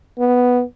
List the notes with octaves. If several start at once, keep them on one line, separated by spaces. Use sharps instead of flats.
B3